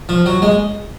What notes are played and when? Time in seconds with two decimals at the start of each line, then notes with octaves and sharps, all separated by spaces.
0.09 F3
0.26 F#3
0.42 G#3